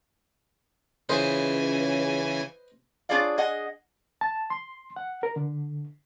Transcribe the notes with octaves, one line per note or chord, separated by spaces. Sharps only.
C#2 C#3 E3 B4 C5 D#5 G#5
D4 F4 G#4 C#5 D5 F5
G#4 D#5 F#5
A5
C6
F#5
A#4
D3